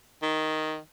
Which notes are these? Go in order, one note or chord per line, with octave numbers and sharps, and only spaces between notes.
D#3